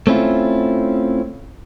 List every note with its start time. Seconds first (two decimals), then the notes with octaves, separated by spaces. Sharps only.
0.07 A3 C4 C#4 E4 F4